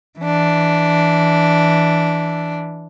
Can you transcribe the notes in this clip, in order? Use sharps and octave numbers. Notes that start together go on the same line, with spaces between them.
E3 D4